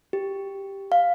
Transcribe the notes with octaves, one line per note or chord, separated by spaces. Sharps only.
G4
F5